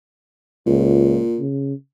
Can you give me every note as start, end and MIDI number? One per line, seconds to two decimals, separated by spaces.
0.66 1.20 37
0.66 1.42 46
1.39 1.73 49